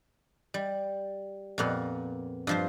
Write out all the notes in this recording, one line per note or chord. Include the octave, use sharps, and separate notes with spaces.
G3
F2 A#2 B3
G2 F3 C5